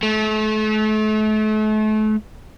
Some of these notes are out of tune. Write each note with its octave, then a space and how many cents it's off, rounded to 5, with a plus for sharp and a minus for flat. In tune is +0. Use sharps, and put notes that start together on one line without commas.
A3 -35